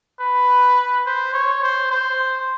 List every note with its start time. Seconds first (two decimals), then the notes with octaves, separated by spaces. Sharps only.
0.20 B4
1.06 C5
1.34 C#5
1.63 C5
1.91 C5